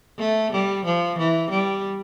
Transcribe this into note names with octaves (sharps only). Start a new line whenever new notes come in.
A3
G3
F3
E3
G3